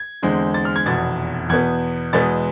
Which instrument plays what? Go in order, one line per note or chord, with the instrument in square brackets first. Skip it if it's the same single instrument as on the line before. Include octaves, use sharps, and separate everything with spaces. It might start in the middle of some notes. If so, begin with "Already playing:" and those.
Already playing: [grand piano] G#6
E2 D3 G#3 C4
A6
F6
G#6
F1 E2 B2 A6
E2 B2 B3 G#6
E2 B2 G#3 B3 A6